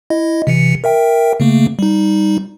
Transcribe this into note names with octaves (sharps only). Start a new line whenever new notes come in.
E4 D#5
C3 E3 C#7
A#4 E5 G5
C#3 A3 A#3
G3 D#4